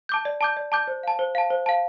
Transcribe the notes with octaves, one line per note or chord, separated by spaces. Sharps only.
A5 D6 G6
D5
A5 D6 G6
D5
A5 D6 G6
C5
F5 A5
C5
F5 A5
C5
F5 A5